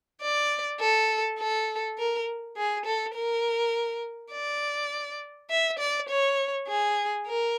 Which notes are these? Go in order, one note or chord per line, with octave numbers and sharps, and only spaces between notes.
D5
A4
A4
A#4
G#4
A4
A#4
D5
E5
D5
C#5
G#4
A#4